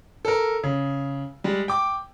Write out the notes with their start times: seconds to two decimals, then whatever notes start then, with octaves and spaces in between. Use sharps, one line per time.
0.25 A4 A#4
0.64 C#3
1.44 G3 G#3
1.68 G5 D6